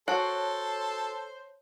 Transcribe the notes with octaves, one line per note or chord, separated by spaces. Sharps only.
F#4 A4 C5 C#5 A5